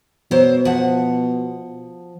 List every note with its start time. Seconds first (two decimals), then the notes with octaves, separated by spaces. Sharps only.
0.31 B2 F#3 C5
0.65 F3 F#5